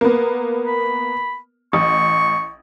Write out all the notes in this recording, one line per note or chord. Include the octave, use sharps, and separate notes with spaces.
A#3 B3
B5
A1 C#6